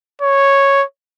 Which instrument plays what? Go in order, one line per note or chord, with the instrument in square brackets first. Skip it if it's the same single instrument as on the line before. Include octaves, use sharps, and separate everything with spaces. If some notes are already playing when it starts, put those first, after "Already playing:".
[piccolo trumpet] C#5